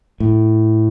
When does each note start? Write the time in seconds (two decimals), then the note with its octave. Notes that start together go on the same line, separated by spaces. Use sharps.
0.20 A2